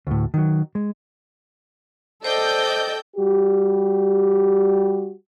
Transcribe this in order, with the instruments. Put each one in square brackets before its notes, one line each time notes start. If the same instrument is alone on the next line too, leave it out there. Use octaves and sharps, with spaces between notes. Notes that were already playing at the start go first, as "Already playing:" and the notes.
[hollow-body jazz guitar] D2 A2
D#3 F#3
G#3
[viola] A4 [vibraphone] C5 [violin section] D5 D#5 G6 [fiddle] G5
[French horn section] G3 F#4 G4